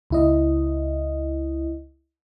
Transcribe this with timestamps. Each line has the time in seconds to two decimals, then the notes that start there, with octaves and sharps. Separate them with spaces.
0.10 C#2 E4 D#5